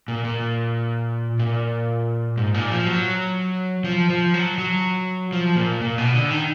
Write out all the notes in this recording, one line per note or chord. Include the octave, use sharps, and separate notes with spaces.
A#2
A#2
A#2
G#2
A#2
F3
F#3
F3
F3
F#3
F#3
F3
A#2
A#2
B2
D3
D#3